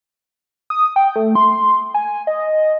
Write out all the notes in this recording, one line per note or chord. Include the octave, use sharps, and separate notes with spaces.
D#6
G5
A3
C6
G#5
D#5